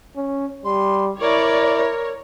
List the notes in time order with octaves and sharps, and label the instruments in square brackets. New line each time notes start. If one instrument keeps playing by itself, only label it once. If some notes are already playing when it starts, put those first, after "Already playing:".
[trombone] C#4
[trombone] G3 [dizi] C6
[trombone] E4 [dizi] A#4 [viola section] C#5 D5
[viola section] C#5